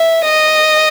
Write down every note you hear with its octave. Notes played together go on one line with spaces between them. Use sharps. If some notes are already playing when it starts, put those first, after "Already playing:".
Already playing: E5
D#5